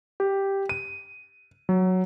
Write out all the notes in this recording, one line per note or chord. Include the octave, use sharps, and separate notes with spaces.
G4
D#7
F#3